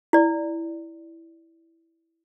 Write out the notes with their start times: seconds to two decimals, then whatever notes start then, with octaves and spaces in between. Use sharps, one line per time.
0.13 E4 D5